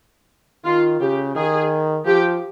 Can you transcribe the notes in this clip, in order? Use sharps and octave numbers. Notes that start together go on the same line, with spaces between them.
D#3 F4
C#3 G4
D#3 G#4
F3 G4